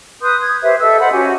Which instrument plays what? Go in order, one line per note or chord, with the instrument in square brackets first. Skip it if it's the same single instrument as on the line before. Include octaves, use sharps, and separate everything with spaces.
[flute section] B4 C6 D#6 G6
G#6
G4 B4 C5 E5
A4 D#5 E5 E6
C5 D#5 F#5 B5
C#4 F#4 G4 G#5